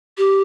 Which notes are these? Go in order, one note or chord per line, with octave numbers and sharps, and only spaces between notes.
G4